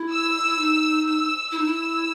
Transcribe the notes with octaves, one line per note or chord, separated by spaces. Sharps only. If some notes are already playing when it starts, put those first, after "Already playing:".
Already playing: E4
E6
E4
D#4
E6
E4 E6
D#4
E4